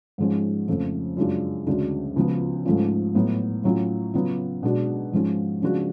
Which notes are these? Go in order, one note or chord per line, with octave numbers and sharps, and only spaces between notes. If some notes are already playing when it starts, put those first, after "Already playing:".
G#2 F3 G#3 C#4
F2 C#3 F3 A3
F#2 C#3 G#3 D4 F4
D2 C#3 G#3 D4
C#2 C#3 F3 B3
G#2 F3 A3 C#4 F4
A2 F#3 B3
A2 F#3 C#4 F4
C#3 F#3 B3 F4
B2 G#3 D4 F#4
G#2 F3 G#3 C#4 F4
C#3 F3 G#3 D4 F#4